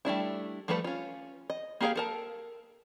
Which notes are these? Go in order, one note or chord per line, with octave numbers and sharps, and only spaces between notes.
G3 A3 D4 E4
F3 G3 A3 A4 B4
C#4 F4
D#5
A#3 G4 G#4 A#4 F5
A4 A#4 A5